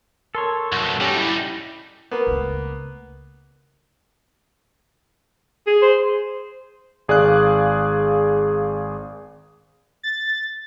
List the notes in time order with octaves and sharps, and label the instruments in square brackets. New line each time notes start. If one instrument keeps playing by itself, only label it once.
[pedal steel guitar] A4 C#5 [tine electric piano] A#4 A5 C6
[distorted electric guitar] B1 F#2 [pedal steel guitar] F#4 A4
[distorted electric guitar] G3 D#4 [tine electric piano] C#4 G4
[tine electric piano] E4
[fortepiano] A#3 B3
[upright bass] C#2 A3
[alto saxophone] G#4
[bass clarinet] C5
[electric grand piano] G#1 G#4 D5 F5 F#6
[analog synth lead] A6